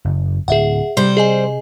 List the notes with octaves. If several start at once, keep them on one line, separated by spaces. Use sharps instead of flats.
F#1
D1 G#4 E5 F#5
C3 G3 C5
G#4 D#5 G#5